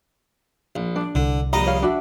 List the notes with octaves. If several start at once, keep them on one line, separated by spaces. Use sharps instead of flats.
A#1
D4
C2 D3
A#1 G3 D#5 A#5
C#5 F5
D4 F#4 E5